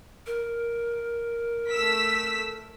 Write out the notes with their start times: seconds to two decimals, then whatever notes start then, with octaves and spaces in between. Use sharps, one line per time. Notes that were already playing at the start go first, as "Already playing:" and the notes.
0.26 A#4
1.69 A3 E6 B6